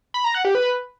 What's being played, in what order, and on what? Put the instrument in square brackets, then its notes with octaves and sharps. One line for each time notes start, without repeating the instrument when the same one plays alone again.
[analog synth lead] B5
A#5
F#5
G4
B4